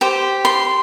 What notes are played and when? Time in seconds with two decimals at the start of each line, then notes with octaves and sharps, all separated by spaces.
0.01 G4 C5
0.45 C6